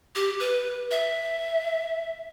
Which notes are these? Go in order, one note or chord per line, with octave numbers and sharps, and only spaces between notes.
G4
B4
E5